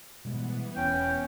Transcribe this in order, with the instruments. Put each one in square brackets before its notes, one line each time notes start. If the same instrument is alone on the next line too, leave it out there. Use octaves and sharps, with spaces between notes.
[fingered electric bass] B2 G3 G#3 [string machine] E3 B3
[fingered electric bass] E1 [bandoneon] C#4 [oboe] G5